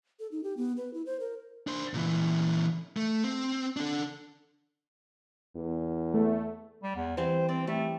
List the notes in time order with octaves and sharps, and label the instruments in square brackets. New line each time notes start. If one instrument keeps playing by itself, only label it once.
[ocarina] A4
D#4
G4
B3
B4
E4
C5
A#4
[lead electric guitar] D4 C5
A#2 E3
A3
C4
D4 A4
[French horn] E2
[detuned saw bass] A3
[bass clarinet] G3
E2
[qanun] E3 G3 C4 [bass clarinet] C5
[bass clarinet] C4 [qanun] D5
[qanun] G3 [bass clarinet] A3